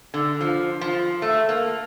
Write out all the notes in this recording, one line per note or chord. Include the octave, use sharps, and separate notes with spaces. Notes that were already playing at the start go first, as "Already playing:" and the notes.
D3
F3
F3
A3
A#3